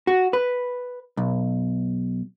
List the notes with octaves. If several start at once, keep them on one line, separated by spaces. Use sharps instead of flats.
F#4
B4
B1